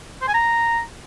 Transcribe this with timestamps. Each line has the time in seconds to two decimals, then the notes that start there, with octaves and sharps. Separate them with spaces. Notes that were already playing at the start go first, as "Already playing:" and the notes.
0.22 C5
0.28 G#5
0.34 A#5